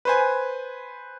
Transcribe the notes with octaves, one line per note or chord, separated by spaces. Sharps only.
B4 C5 G#5